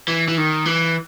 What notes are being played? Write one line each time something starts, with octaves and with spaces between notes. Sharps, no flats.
E3
E3
D#3
E3